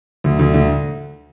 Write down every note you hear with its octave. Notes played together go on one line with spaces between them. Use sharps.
D2
D2
D2